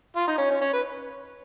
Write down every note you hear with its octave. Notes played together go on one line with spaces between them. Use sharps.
F4
D#4
C#4
C#4
C#4
B4